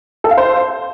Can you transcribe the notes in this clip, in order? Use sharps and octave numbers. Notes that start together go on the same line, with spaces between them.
A4
F5
C5